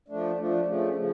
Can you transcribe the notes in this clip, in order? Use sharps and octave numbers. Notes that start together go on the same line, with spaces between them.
F3 A3 D4
F3 A3 D4
C#3 F3 A3
C#3 F3